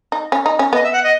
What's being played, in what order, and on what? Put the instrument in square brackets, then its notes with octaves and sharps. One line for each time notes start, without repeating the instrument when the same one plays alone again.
[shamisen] D#4
C#4
D#4
C#4
[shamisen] B3 [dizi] D#5
[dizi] E5
F#5
D#5